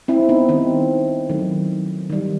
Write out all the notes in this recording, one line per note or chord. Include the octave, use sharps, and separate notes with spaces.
C4 E4
B3 D#4
D#3 G3 C4
D#3 F#3 A3
D#3 G3